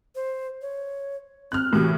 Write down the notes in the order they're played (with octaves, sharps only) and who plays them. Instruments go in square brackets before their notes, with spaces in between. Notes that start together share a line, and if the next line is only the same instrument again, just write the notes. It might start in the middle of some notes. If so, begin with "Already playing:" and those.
[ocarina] C5
C#5
[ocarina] C4 [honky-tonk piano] F6 F#6
[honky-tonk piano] A2 C3 E3 [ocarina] F#4